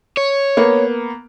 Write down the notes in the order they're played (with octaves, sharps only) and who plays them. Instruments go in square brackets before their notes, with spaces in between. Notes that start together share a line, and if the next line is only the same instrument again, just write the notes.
[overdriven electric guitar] C#5
[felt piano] A#3 B3